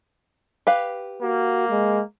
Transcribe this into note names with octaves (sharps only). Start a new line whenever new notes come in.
G4 B4 F5
A#3 F#4
G#3